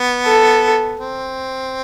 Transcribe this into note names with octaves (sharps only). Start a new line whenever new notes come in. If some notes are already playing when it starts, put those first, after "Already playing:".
Already playing: B3
A4
C4